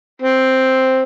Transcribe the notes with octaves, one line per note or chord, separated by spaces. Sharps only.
C4